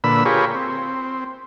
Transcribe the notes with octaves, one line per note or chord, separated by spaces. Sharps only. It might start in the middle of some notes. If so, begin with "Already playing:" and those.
A#2 D3 B4 B5 E6
F4 G4 G#4 A#4 B4 C#5
C4